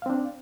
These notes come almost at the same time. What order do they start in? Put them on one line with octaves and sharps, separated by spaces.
F5 C4 D4